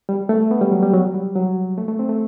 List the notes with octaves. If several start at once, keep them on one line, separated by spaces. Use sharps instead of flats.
G3
A3
B3
G3
F#3
G3
F#3
G3
F#3
A3
A3
C4
A3